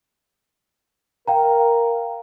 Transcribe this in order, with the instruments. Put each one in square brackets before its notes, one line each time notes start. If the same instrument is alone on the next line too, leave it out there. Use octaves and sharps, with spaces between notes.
[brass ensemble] A#4 [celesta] F5 G5 A#5